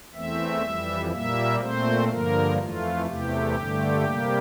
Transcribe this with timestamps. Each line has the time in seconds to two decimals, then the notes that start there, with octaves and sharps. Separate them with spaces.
0.14 E2 E3 A3 C4 E5
0.63 F2 E3 G3
1.11 A#2 G3 A#3 E5
1.60 A#2 A3 C4 C5
2.09 G2 D3 F3 A#3 A#4
2.58 F2 E3 A3 F4
3.07 E2 C3 E3 A3 G4
3.56 G2 D3 A3
4.05 C3 G3 A#3